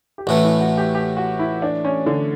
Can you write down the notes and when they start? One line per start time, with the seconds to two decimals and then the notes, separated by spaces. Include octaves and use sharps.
0.18 G4
0.27 A1 A2 E3 A3 F#4
0.44 E4
0.61 F#4
0.78 G4
0.95 G4
1.17 F#4
1.39 E4
1.62 D4
1.85 C#4
2.06 D3